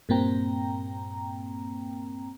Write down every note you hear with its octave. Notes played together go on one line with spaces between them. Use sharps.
G2 A#2 A#3 C4 G5 A#5